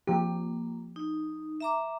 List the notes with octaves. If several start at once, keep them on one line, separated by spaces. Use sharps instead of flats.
F3 A#3 G4
D#4
E5 A#5 D6